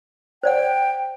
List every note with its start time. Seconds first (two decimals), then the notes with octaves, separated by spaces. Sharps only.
0.43 C5 D5 F#5 G5